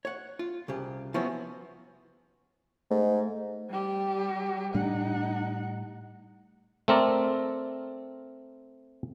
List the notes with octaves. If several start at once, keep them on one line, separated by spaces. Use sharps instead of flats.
C#5 F#5
F4
C2 C#3 G4
F3 F#3 B3 C#4 E4 F#4
G#2 A3
G3 G4
A2 G3 D4 D#4 F#5
A3 C4 A#4 D5